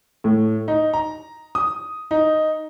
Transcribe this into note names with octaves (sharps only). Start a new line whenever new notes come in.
A2
D#4
A#5
D#6
D#4